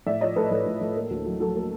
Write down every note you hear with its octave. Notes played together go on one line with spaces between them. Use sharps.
A2 D5 E5
F3 C#5 D#5
A2 A4 B4
A2 A4
A2
A2
A#3
D2
F#3
F#3 A4
A#3